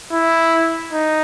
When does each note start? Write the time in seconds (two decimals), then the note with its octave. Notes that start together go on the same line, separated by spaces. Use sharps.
0.12 E4
0.93 D#4